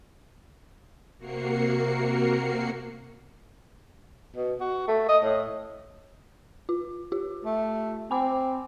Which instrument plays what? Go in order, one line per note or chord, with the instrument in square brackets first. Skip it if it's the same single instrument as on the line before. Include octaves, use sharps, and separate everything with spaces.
[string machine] C3 A#3 F#4 A#4 C7 C#7
[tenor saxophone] B2
F#4
A3
D#5
A2
[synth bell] F4
F4 G4
[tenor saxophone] A3
[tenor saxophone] C4 [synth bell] G#5 B5 D6